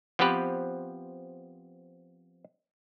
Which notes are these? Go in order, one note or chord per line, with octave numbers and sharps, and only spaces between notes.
F3 B3 C4 G4 B4